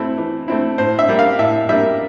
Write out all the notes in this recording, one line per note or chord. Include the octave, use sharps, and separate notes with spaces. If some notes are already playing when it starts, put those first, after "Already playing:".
Already playing: A3 C4 E4
E3
A3 C4 E4
A2 C5
E5
G3 A#3
F5
A2 E5
G3 A#3 E5